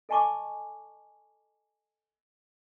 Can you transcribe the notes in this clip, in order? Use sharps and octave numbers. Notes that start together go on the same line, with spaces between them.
A4 D#5 G#5 A5 C#6 D6